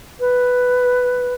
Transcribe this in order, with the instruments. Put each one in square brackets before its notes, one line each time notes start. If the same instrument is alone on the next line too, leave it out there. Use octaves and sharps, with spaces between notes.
[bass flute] B4